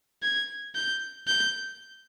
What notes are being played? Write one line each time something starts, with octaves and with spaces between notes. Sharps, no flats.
G#6
G6
G6